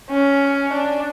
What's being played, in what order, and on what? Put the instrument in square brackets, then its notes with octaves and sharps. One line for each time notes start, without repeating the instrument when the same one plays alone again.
[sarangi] C#4
D4